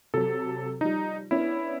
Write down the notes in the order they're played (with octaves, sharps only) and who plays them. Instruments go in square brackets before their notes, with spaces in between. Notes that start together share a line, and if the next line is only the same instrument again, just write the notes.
[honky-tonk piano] C3 F#3 [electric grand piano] A4
[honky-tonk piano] F3 G3 [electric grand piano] D#4
[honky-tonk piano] B3 C#4 D4 [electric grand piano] E4